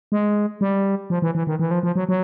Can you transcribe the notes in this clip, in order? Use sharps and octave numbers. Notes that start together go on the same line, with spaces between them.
G#3
G3
F3
E3
E3
D#3
E3
F3
F3
F#3
F#3